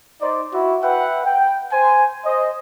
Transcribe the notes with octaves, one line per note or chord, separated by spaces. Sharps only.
D#4 C5 D5
E4 F#4
B4 E5 F#5 G5
G5
C5 G#5
C5 D#5